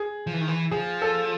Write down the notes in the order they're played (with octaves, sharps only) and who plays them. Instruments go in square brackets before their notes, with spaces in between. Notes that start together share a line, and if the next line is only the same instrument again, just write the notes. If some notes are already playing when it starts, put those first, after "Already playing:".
Already playing: [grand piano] G#4
[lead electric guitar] F3
E3
D#3
E3
[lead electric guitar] F3 [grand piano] G#4
[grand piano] A4